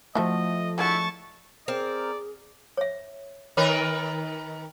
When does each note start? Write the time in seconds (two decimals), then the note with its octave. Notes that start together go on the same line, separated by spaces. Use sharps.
0.15 F3 A3 E4 F#4 C5 D#5
0.78 G#3 D4 E4 F#4 A5 C#6
1.68 C4 G#4 A#4 D5
2.77 C#5 E5
3.57 D#3 A#4 B4 C#5 D#5